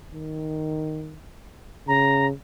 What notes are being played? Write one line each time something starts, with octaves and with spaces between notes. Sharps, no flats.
D#3
C#3 A#5